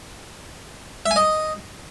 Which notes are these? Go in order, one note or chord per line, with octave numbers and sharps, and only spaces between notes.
E5
G#5
D#5